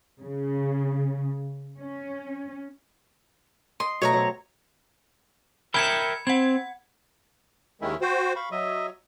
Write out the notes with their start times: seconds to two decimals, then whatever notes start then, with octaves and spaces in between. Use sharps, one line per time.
0.22 C#3
1.77 C#4
3.80 D#5 C6
4.02 B2 F#3 A3 C#5 E5 A#5
4.13 F#3 C4
5.74 A#4 E5 G5 B5 G#6 C#7
6.27 C4 F#5 G#6
7.82 D#2 D#3 G#3 C#4 E4 E5
8.01 F#4 C5 G5
8.36 F5 B5 C#6
8.51 F#3 D#5 E5